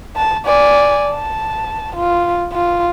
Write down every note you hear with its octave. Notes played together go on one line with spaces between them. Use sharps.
A5
D5 G#5
A5
F4
F4